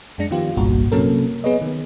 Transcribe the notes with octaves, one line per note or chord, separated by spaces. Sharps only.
F#2 G#3 D4 A#6 C#7
D#3 F3 B3 F4 G4
G1 C2 G2 A#2 F#4
C3 F#3 A#3 C#4 A4 A#4
B3 G#4 B4 C#5 D#5
D#3